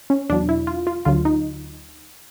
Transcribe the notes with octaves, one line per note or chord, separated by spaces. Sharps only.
C#4
E2 B2 F#3 D4
E4
F4
F4
D2 D3 F#3 F4
D#4